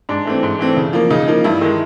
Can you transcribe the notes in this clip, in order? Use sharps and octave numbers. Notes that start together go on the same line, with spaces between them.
G#2 D4
E3 A3 C4
G#2
E3 A3 C4
C#3
F3 A#3
C#3 D#4
F3 A#3
G2 E4
D#3 G#3